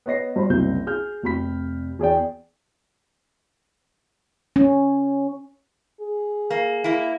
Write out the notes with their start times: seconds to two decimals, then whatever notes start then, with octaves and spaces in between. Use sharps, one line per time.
0.06 B3 C#5 D#5 A#6 C7
0.36 G2 C5 B5
0.49 F#1 C2 C3 G6
0.87 G#4 F6 G6
1.22 F1 C3 B5 B6
1.99 E2 G#4 D5 G5
4.56 C#4
6.01 G#4
6.50 A#3
6.84 A#3 E4